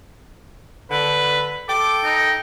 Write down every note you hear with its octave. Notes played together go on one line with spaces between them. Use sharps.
D3 B4
A4 G5 D6
D#4